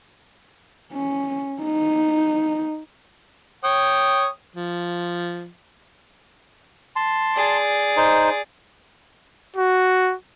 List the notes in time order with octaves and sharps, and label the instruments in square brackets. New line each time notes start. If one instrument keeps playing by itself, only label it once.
[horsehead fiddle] C#4
D#4
[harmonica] C#5 G5 D#6
F3
[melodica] A5 C6
[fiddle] G#4 D5
[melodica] D#4 C5
[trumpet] F#4